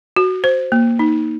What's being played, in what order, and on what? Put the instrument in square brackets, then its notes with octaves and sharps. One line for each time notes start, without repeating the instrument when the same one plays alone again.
[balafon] F#4
C5
A#3
D#4